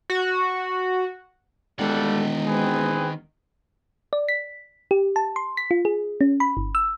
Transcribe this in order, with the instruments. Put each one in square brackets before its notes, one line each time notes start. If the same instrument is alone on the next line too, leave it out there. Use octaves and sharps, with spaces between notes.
[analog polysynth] F#4
[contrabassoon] E1 [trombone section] A#2 G3 A4 [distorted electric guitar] D#3 F#5 [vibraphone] G#3
[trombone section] C4 G#4 B4
[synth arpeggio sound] D5
B6
G4
A5
C6
B6
F4
G#4
C#4
B5
G1
E6